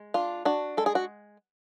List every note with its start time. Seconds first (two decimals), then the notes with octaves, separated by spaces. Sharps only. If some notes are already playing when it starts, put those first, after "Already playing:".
Already playing: G#3
0.14 D4 F4
0.45 D4 F#4
0.77 G#3 A4
0.86 G#4
0.95 F#4